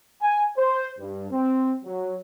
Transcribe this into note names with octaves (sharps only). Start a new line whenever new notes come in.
G#5
C5
G2
C4
F#3